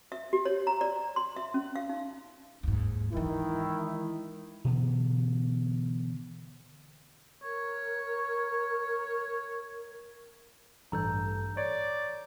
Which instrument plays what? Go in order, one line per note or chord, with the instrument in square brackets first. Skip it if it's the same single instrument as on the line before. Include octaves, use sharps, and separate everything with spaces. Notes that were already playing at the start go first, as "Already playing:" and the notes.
[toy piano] E5
G4
C#5
A#5
D5
C6
E5
C#4
F5
D#4
[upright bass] D#2 G#2
[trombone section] D#3 E4 [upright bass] E3 G#3
[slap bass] B2 D3 E3 B3
[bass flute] A#4 [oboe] C#5
[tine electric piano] A1 G2 A4 [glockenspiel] A#5 G6
[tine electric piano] C#5 [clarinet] D5